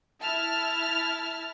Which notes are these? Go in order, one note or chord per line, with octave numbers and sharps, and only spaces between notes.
E4 E5 A5 F6